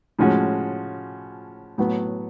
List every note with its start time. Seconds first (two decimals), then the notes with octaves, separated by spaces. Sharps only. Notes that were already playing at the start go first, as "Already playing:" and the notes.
0.19 A2 F3 G#3 C#4 F#4
1.78 A2 F#3 B3